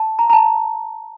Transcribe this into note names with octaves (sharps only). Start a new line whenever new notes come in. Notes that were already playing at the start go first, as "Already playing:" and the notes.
Already playing: A5
A#5
A#5
A5